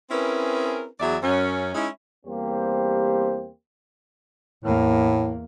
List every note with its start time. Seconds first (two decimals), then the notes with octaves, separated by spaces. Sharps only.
0.11 C4 C#4 E4 G#4 A#4 B4
1.00 E2 F#3 G#4 D5 E5
1.23 F#2 C#4
1.75 G#3 C#4 D#4 E4
2.26 E2 G3 A#3 C4 G4 C5
4.64 E2 A2 A#3